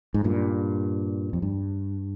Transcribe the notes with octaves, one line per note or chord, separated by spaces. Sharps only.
G#2
G2 A#2
F2
G2